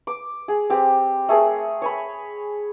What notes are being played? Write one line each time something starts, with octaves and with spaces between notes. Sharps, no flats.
D6
G#4
C4 G4 C5
A3 G#4 A#4
C#5 G#5 B5